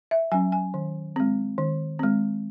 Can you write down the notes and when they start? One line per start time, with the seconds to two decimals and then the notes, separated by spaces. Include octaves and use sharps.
0.11 E5
0.32 F#3 C#4 G#5
0.52 G#5
0.74 D#3
1.16 G#3 C4
1.58 D#3
1.99 G#3 C4